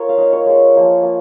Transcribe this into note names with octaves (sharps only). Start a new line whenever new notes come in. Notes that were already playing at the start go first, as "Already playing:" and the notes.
Already playing: F4 A#4 C#5
F5
A#3 D#4 D#5
C#5
G#3 F4
F3 A#3 F4
A#3 F4